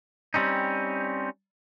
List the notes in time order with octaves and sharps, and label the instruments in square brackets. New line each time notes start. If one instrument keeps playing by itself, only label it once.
[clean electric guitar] G3 C4 C#4 D#4